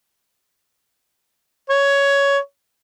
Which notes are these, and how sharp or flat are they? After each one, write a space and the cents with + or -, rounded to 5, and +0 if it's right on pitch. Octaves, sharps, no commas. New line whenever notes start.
C#5 +10